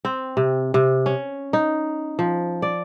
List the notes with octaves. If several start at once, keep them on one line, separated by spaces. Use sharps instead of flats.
C4
C3
C3
C#4
D#4
F3
D5